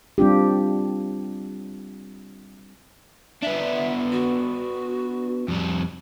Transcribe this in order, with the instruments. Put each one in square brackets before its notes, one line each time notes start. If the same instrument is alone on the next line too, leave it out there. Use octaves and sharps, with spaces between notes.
[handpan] G3 C4 D4 F4 G4
[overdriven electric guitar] B3 D4 [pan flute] E5
[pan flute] F#4
[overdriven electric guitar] F2 G3